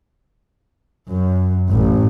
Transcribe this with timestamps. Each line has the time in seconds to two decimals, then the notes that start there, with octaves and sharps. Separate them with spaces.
1.11 F#2
1.70 A1